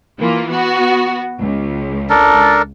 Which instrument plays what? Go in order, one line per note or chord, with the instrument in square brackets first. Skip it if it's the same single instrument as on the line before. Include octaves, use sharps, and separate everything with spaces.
[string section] E3 A#3 F4
B3 F#4
C#2
[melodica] D4 A4 A#4